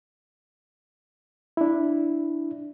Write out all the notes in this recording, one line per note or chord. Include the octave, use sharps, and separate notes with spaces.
D4 E4